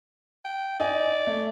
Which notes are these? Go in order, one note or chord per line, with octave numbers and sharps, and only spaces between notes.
G5
D#4 D5 G#5
A3